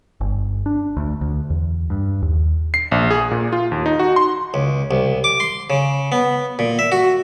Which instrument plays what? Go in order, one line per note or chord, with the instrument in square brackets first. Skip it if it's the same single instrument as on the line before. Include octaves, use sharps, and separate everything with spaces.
[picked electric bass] G1
D4
D2
D2
E2
G2
D#2
[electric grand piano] C7
A#1
G#4
A#2
F4
D#2
D#4
F#4
C6
[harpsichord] C#2
C2
D6
C6
C#3
B3
A#2
E5
F#4